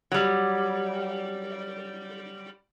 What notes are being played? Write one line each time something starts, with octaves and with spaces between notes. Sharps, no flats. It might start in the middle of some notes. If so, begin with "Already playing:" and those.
F#3 G3